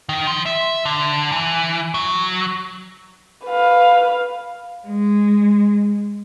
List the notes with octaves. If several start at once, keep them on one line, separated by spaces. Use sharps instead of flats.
D#3
F3
E5
D3
E3
F#3
B4 F5
G#3